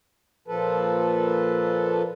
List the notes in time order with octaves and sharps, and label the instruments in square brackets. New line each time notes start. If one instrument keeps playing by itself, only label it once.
[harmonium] A#2 F3 A4 B4